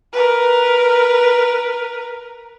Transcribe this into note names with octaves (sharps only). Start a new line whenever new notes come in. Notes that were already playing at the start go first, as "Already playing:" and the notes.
A#4 B4